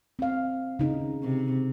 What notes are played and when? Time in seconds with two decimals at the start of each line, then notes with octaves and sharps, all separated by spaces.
0.19 C4 F5
0.79 C#3 D#4
1.23 C3